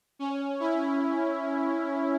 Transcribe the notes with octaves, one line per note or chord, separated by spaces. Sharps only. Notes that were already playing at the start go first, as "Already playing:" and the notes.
C#4
E4